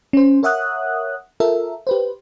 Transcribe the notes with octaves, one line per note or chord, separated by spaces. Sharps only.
C#4 C5
A#4 C#5 E5 F#5 D#6 F#6
F4 A4 A#4 E5
G4 B4 C5